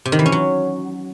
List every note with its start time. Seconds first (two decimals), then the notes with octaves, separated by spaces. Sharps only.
0.05 C3
0.12 D#3
0.19 E3
0.26 C#4
0.32 F#3